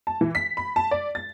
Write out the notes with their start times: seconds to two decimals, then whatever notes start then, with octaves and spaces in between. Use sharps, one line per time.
0.07 A5
0.21 E3
0.35 B6
0.57 B5
0.76 A5
0.91 D5
1.15 A6